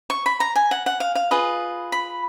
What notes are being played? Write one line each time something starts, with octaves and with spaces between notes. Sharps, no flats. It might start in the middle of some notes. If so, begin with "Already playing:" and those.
C#6
B5
A#5
G#5
F#5
F#5
F5
F5
F4 G#4 B4 D#5
B5